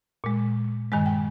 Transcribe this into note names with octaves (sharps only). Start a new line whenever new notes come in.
A#2 G#3
G2 D#3 G#3 G#5
G5